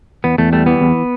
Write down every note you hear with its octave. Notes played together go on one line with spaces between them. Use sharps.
E2 B3
E2 A3
G3 A3
E3 B3
E2